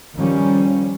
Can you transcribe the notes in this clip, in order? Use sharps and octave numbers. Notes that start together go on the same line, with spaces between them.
D#3 F3 G3 C#4